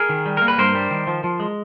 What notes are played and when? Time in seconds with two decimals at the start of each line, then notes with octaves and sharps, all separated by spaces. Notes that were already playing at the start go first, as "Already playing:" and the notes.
Already playing: G#4 A#4
0.09 D#3
0.26 G3
0.37 A#3 A#4
0.48 B4
0.58 G2 A#4 C5
0.75 G3
0.91 D#3
1.07 F3
1.24 F3
1.40 G#3